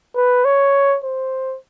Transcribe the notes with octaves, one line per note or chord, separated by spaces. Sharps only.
B4
C#5
C5